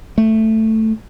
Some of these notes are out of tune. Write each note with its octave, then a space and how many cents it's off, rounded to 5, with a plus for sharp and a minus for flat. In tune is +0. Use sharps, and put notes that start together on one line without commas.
A3 +5